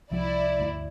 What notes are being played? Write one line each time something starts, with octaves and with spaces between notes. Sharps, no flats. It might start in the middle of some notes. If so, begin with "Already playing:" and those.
C2 F3 G3 E4 D5
D2 G2